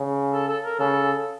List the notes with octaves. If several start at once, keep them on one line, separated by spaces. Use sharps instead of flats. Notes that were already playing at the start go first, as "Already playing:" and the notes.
Already playing: C#3
A4
A4
A#4
C#3 A4